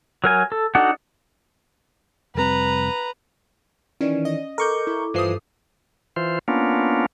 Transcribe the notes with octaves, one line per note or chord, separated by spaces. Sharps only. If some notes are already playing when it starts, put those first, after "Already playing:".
F#3 A#4 G#5
A4
D4 D#4 F#4 A4 F#5
F1 G3 C4 B4 A#5
D#3 E3 C#4 D5
D#5
A4 A#4 C#6 D6 G6
E4
G2 E3 F3 D#6 C7
E3 F4 C5
A#3 B3 C#4 D4 F4